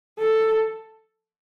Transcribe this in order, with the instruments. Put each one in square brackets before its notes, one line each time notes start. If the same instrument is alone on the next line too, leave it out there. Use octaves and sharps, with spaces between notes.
[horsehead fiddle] A4